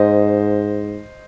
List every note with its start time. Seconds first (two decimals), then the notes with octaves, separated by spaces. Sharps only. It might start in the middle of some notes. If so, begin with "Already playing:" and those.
Already playing: G#2 C5 D#5